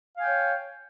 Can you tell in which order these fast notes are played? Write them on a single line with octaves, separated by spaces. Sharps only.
F5 G#5 G5 C#5